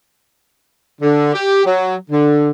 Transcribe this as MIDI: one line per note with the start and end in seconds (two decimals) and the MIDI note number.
1.01 1.33 50
1.34 1.65 67
1.65 1.95 54
2.10 2.51 50